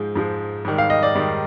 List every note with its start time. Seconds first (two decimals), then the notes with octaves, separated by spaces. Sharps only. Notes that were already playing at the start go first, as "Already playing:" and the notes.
Already playing: G#2 F3 G#3
0.16 G#2 F3 G#3
0.65 G#2 D#3 G3
0.78 F5
0.90 D#5
1.03 D5
1.15 G#2 D#3 G3